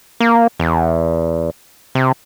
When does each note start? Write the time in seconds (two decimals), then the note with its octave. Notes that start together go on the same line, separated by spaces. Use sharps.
0.20 A#3
0.60 E2
1.95 C3